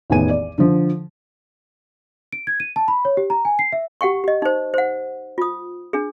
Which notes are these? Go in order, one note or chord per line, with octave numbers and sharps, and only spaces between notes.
A1 E2 D#3 B3 G#5 D#7
D5
D3 F3
D7
G#6
D#7
A5
B5
C#5
G4
A#5
G#5
C7
E5
G4 F#5 G5 C#6
G4 D#5
D#4 C5
C5 F#5
F4 D#6
D4 G#4